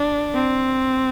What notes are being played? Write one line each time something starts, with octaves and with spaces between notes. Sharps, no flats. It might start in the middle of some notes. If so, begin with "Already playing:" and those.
Already playing: D4
C4